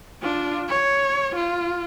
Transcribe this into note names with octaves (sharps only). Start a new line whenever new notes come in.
D4 F4
C#5
F4